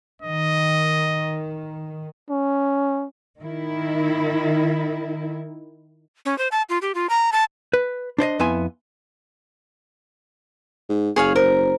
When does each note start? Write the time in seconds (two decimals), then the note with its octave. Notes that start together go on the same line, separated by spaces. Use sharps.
0.22 D#3 D#5
2.30 C#4
3.39 D#3 E4
6.25 C#4
6.38 C5
6.52 A5
6.69 F4
6.82 G4
6.95 F4
7.10 A#5
7.32 A5
7.73 B4
8.18 D4 C5 D5 D#5
8.39 F2 B3 E4 E5 G#5 C6
10.89 G#2
11.16 F#1 G#4 C#5 F5
11.36 A#4 C5